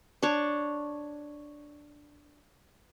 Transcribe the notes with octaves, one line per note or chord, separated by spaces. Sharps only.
D4 C#5